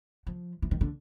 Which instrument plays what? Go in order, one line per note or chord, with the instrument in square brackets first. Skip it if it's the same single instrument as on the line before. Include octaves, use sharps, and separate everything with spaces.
[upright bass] F3
E3
D#3
D3